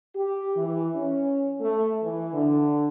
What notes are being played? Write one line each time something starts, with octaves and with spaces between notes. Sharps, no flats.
G4
E3
C#4
A3
E3
D3